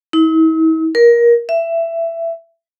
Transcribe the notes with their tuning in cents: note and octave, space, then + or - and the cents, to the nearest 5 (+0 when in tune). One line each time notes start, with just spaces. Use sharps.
E4 -45
A#4 +20
E5 +15